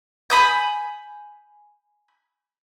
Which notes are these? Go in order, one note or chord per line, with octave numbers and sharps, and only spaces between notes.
G#5 B5 D#6 G6